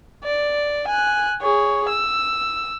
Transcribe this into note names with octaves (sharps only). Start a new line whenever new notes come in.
D5
G#5 F#6
G#4 C#5
E6